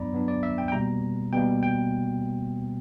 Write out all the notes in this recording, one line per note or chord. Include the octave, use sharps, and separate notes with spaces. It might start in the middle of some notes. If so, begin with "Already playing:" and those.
Already playing: G2 F#3 B3 D4 D5 A#5 B5
G2 F#3 B3 D4
D5
E5
G5
G5
B2 G3 A#3 A#5
B2 G3 A#3 G5
G5